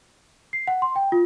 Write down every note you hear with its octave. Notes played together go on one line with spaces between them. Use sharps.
C7
F#5
C6
G5
F4